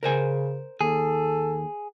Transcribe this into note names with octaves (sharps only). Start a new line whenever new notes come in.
C#3 A#4 C5 G#5
D#2 G#4 A4